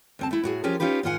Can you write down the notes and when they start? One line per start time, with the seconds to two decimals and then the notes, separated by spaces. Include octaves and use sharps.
0.19 D2 C4 A5
0.31 A3 E4
0.44 A2 F#4 G#4
0.63 F3 C#4 F4 G4 G#4 A#4
0.80 C#4 D#4 F4 G4 B4
1.03 G#2 D#3 F4 D5 F#5 G#5